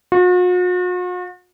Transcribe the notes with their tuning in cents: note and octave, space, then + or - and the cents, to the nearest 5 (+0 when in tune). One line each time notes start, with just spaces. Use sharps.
F#4 -45